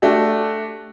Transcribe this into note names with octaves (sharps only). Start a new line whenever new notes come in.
A3 D4 F#4 G4